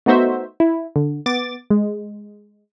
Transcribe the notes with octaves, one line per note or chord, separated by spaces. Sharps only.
A3 B3 D#4 F#4 C5 E5
E4
D3
B3 D6 A6
G#3